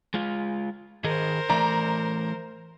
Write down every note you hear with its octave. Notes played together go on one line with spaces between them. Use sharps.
G#3 F4
D#3 G#4 A#4 C5 D#5
E3 A3 D5 A#5